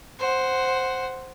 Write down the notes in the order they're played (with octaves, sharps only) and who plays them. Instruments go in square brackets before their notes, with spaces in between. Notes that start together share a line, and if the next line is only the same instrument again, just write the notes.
[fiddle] C5 F#5